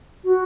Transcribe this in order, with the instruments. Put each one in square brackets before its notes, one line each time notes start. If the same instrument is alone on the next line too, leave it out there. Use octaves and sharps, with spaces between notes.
[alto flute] F#4